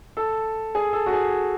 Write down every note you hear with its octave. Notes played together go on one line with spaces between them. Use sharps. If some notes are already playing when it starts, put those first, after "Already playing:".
A4
G#4
A4
F#4
G#4